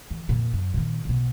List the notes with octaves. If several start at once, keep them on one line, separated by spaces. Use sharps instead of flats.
D#3 E3
F2 A#2
F#2
A#2 D#3
B1 B2